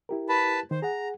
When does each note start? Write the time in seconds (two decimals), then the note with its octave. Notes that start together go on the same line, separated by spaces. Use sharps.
0.09 E4 G4 A#4
0.29 B4 A5 B5
0.71 D#3 C5
0.82 G#4 F#5 A#5